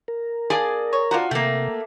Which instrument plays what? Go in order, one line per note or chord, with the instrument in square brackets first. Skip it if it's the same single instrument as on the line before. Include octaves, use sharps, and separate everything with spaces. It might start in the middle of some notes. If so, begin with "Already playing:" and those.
[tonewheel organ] A#4
[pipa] A#3 D4 A5 [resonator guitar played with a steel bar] G#4 D5 G#5
[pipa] C#5
[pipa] D4 C5 A#5 [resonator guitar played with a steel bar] F4 F#4
[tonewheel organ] C3 [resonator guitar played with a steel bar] A3 A#3 [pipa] G5